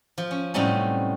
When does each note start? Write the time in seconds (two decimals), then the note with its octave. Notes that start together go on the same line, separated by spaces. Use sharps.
0.18 F3
0.31 C#4
0.54 A2 C3 F#3 G3 C#4 D#4